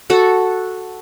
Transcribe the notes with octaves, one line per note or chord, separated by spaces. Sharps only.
F#4 A4 F#5